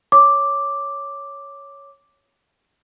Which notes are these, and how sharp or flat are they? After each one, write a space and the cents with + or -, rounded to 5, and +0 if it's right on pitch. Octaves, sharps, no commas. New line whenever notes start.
C#5 +0 D6 +0